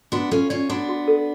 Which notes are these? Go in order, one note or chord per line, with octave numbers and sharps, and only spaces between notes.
B3 D4 F#4
C#4 F4 A4
C#4 F4 D5
B3 D4 F#4
F#4
A4